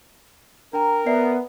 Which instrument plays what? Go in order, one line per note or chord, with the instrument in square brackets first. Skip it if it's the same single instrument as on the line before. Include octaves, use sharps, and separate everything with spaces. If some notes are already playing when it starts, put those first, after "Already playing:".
[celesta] D4 G5 A#5 [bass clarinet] A#4
[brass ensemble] B3 [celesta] D5 E5 C7